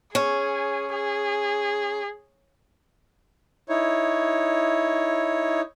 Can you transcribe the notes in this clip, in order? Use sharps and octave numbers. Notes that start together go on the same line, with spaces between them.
C#4 G#4
G#4
D#4 E4 C#5